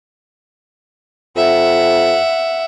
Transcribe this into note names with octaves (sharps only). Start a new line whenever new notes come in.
F2 E5 F#5